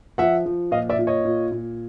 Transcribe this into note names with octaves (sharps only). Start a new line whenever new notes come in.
F3 E5 F#5
F3
A#2 D#5 F5
D5 E5
A#2
C#5 D#5
A#2
A#2